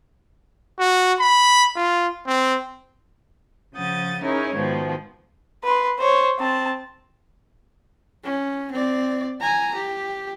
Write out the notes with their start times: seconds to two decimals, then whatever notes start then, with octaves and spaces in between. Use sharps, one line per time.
0.79 F#4
1.20 B5
1.76 F4
2.26 C4
3.74 C#3 F3 F#5 D#6 G6 A6
4.21 C#4 D#4 E4 G#4 A#4 C#5
4.55 G#2 B2 D#3 F3 G#3
5.64 B4 C6
5.99 C5 C#5
6.39 C4 A5
8.24 C#4
8.72 C4 D5
9.41 G#5 A#5
9.75 G4